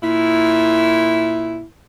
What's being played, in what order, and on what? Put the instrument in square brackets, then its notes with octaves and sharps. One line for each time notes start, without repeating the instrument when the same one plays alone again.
[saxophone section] A#2 E4